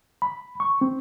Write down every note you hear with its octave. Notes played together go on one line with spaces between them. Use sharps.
B5
C#6
C4